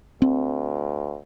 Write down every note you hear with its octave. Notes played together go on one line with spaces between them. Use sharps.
D2 C4